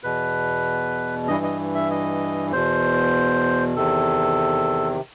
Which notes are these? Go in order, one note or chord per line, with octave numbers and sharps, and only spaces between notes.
E2 B2 B4
G2 E3 D#5
D#5
E5
D#5
E2 B2 C5
E2 C3 D#3 A4